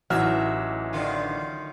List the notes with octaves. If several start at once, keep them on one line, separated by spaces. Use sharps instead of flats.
A1 E3 F#3 D#4 E5 F6
D3 D#3 F4